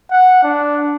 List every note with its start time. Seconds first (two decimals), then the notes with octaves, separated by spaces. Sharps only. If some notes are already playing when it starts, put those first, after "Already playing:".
0.11 F#5
0.43 D4